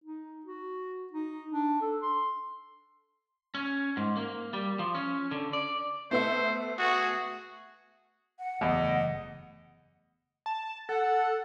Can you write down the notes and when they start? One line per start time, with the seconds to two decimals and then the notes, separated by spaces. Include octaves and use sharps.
0.04 D#4
0.45 F#4
1.12 D#4
1.52 D4
1.81 A4
2.02 C6
3.55 C#4
3.97 G#2
4.17 A#3
4.53 G3
4.79 F3
4.95 C#4
5.31 D3
5.53 D5
6.11 A3 B3 C5 E5
6.79 F#4 G#4
8.39 F#5
8.61 F#1 E2 E3 A3 D#5
10.46 A5
10.89 A4 F#5